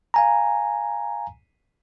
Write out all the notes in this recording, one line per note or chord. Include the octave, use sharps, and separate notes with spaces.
F5 G#5 A#5